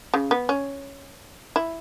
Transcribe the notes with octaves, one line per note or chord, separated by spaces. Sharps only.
C#3
B3
C#4
E4